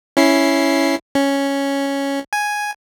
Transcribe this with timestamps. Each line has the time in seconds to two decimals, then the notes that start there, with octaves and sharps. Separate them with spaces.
0.17 C#4 E4 C7
1.15 C#4
2.33 G#5